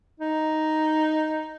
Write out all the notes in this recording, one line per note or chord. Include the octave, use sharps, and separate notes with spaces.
D#4